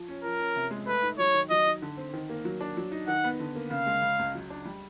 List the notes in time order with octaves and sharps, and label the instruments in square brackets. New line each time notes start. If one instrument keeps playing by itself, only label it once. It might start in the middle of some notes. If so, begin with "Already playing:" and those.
Already playing: [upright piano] F3
C#4
[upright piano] F3 [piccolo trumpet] A#4
[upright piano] C#4
C3
G#3
[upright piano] A3 [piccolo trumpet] B4
[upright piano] D#4
[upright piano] F#3 [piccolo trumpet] C#5
[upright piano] D#3
[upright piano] F#3 [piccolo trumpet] D#5
[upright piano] D#4
D3
C4
D#3
A#3
F#3
D4
F#3
D#4
[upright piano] D#3 [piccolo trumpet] F#5
[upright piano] B3
D3
A#3
[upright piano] C#3 [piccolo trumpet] F5
[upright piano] G#3
C#3
C#2
F#3
D4
G3